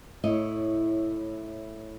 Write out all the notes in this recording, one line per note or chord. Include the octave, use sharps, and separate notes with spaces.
A2 E4 C#5 D#5